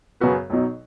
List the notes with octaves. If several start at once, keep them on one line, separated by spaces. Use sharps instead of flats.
F#2 C#3 B3 F#4 B4
B1 B2 F#3 D#4